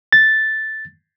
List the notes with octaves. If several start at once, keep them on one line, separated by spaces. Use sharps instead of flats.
A6